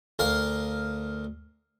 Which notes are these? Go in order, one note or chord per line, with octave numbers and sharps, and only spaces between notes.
D2 A#4 F5